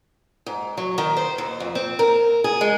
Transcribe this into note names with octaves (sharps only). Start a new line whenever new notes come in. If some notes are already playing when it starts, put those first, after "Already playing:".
G#2
F#3
D#3
C5
D#2
F2
C4
A#4
G#4
G#3